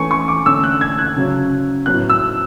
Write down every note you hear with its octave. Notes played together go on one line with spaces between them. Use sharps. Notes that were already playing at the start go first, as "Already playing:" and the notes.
Already playing: E3 A3 C#4 G#5 C#6
C#6
D6
D3 A3 C#4 E6
F#6
G#6
F#6
C#3 F#3 C#4
A2 F#3 B3 F#6
E6